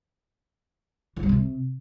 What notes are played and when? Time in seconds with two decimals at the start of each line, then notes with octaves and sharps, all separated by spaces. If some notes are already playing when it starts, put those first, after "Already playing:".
1.16 E3
1.23 G3
1.29 C3